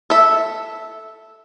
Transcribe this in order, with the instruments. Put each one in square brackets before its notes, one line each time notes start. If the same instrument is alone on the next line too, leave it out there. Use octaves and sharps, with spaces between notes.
[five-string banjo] A4 E5